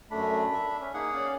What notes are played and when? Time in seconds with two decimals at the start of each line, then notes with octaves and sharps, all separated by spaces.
0.11 F#2 A3 D4 B5
0.53 E5
0.81 C#4
0.94 A#3 D#4 G#4 F#5
1.14 C#4 D5 F5